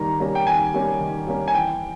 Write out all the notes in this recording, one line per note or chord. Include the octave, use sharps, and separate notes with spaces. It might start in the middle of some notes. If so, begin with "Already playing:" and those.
Already playing: D#3 G3 A#3 A#5
G3 A#3 C#4
G5
D#3 G#5
G3 A#3 C#4
D#3
G3 A#3 C#4
G#5
E3 G5